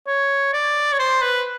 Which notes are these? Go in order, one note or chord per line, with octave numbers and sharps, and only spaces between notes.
C#5
D5
C#5
C5
B4